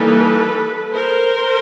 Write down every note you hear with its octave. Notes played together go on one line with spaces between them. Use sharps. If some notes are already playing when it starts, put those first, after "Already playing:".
Already playing: E3 G3 A#3 D#4 A4 B4
A#4 C5